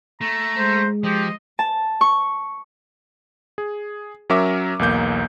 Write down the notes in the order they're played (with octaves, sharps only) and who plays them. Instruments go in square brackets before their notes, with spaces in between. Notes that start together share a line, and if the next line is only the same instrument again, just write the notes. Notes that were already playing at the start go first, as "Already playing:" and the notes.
[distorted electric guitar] A3 [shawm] A#5
[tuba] G#3 [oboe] C5
[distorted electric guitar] F3 [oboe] G4 [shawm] D#5
[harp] A5
C#6
[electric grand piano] G#4
F#3 C#4 A#4 E5 D6
B1 E2 A#3 G6